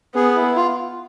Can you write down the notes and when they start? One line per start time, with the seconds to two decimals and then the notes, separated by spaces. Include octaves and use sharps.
0.15 B3 G#4
0.35 E4
0.56 F4